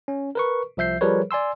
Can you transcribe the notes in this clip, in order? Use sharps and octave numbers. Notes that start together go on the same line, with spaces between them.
C#4
A#4 B4 C#6
C2 F3 E5 G6 C7
F3 G3 G#4 A#4 B4 C#5
D5 G#5 C6 E6